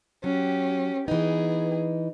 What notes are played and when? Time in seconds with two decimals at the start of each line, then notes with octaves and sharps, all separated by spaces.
0.24 F#3 C#4 G4
1.08 E3 B3 D#4 G#4